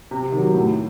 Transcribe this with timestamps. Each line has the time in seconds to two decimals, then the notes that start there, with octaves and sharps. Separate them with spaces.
0.11 C3
0.32 D#3 F#3
0.54 A2